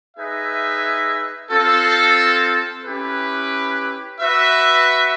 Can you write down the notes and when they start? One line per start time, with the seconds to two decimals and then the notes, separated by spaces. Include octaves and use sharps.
0.17 D#4 G#4 B4 E5
1.51 C4 F4 A4
2.86 C#4 E4 G4 B4
4.21 F#4 B4 E5